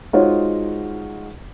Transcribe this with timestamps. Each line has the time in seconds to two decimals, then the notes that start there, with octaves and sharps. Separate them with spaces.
0.13 G#3 D#4 F4 F#4 C5 C#5